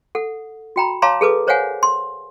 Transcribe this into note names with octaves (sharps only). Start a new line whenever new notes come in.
A4 F#5
F#4 G5 A#5 B5
C#5 F5 A5 A#5 C6 D6
G#4 A4 B4 D6
A#4 C5 C#5 F5 F#5 G#5
C6